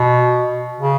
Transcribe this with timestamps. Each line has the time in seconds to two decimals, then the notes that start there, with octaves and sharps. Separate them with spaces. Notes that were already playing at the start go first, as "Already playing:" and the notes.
Already playing: B2
0.81 C#3